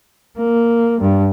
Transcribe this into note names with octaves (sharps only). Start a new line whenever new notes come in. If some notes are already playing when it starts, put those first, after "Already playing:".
A#3
G2